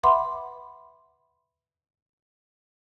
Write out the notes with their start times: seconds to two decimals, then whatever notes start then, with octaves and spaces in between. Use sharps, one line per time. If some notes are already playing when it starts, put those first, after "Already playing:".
0.03 B4 E5 F#5 B5 C6 D6